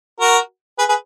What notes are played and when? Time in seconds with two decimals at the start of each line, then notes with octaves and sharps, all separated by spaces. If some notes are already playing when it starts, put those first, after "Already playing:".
0.20 F#4 A#4
0.79 G#4 B4
0.89 G#4 B4